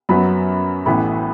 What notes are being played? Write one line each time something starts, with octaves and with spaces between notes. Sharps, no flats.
F#2 F#3 B3 B5
A1 A2 E3 B3 B5